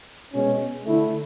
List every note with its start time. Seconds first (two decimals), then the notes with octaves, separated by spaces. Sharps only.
0.33 B2 G#3 C#4
0.85 D3 A3 E4